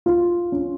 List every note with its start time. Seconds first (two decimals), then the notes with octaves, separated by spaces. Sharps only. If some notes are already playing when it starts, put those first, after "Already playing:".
0.06 F4
0.52 C#4